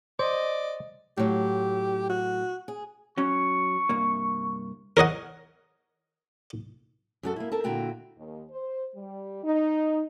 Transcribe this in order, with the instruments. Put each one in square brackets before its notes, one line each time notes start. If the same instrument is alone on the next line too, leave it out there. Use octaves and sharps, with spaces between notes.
[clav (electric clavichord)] C5 [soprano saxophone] D5 [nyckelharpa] D#5
[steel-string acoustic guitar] A2 F#3 [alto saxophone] G4
[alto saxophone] F#4
[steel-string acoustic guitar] G#4
[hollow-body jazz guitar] F#3 C#4 [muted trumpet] C#6
[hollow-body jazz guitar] C2 G2 A#3
[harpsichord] A#4 C#5 D#5 F#5
[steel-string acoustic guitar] F#2 F#4 A4
A#3 E4
A4 A#4 A5
A#2 D3 E4 F#4 G5 A#5
[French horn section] D#2
C5
G3
D#4